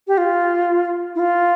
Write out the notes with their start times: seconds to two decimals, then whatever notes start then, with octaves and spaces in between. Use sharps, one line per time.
0.08 G4
0.18 F4
1.15 E4
1.19 F4